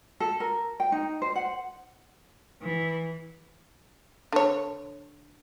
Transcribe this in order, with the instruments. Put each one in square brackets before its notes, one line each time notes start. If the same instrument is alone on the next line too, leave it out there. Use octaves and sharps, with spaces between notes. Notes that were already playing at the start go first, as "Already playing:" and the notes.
[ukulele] A4
A#4
G5
D#4
C5
F#5
[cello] E3
[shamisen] D3 C#5